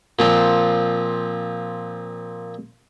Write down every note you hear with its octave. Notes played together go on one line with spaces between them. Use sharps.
A#2 F3 C4